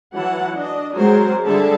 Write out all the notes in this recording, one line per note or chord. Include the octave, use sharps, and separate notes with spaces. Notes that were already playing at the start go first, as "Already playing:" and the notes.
E3 F#3 E4 F#5 A5
D4 D#5
F#3 G#3 C4 A#4 C5
D3 G3 G#4 A4 E5 A5